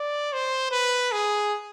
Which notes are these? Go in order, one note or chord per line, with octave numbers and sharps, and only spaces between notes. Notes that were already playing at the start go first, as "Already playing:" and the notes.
Already playing: D5
C5
B4
G#4